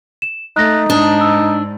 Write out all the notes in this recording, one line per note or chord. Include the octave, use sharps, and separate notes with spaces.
E7
A3 D#4 F#6 A#6
G#2 D4 D#6
E6